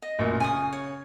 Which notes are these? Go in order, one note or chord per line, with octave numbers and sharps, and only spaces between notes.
D#5
A1 F#2 A#2
C#3 G#5 C#6 D#6
C#5